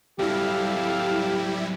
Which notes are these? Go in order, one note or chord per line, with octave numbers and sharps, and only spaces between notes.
F#3 G3 C4 E4 G4 A4 F5